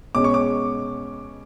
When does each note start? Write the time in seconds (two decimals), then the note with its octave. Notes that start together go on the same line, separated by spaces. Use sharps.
0.15 B2 G#3 C#4 D6
0.24 C#6
0.34 D6